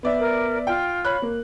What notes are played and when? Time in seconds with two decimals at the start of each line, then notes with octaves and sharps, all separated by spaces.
0.03 B3 D5 E5
0.19 A#4
0.67 F4 G5
1.05 C#5 B5 F#6
1.22 A#3